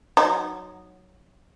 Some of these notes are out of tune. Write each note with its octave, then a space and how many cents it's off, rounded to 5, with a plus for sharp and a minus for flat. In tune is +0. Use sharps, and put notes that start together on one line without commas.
F#3 +0 D#4 -5